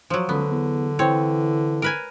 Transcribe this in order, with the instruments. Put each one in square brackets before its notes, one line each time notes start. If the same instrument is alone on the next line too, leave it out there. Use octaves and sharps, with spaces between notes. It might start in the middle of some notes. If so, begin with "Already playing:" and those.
[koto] F3 F#3
[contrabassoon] C#2 [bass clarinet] D3 [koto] B3
[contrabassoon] E2
[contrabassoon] E3 [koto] C4 C#5
[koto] A#4 B4 G#5